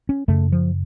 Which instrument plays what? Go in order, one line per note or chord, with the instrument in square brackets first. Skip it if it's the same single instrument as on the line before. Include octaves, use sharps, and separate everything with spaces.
[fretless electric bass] C#4
F#2 C#3 A3
F3